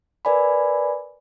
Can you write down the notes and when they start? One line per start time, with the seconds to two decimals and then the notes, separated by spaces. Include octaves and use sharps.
0.25 A#4 B4 D5 G#5 B5